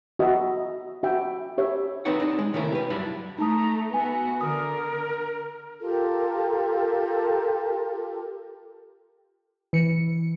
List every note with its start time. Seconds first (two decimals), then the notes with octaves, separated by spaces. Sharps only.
0.19 F#4 D#5 E5
1.03 F#4 E5 G5
1.58 G4 C#5 E5
2.05 C4 D#4 B4 C#5 F#5
2.20 D4 D#4
2.39 G#3
2.54 C3 D#3 A3 C#4 E4 A#4
2.72 G4 B4
2.90 F#2 G3 D4 E4 B5
3.38 A3 D#4 A5 A#5 D#6
3.94 B3 F#4 E5 G#5
4.41 D3 A#4 D#6
5.81 F4 G4 A4 A#4
9.73 E3 C#7